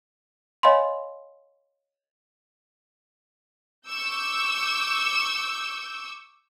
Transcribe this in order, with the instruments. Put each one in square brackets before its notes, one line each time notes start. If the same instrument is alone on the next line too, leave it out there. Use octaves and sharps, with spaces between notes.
[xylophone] C#5 D#5 F5 G#5 B5 C6
[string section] C#6 D6 E6 G6